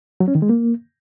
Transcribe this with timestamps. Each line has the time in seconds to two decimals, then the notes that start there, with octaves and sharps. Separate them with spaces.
0.20 F#3
0.28 C#4
0.35 D#3
0.42 G#3
0.49 A#3